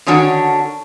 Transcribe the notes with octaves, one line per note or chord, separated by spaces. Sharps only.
D3 D#3 C#4 D4 F#4